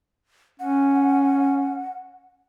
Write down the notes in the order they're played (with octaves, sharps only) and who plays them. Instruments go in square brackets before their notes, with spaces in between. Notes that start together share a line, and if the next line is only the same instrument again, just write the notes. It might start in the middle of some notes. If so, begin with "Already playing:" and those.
[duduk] C#4 [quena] F#5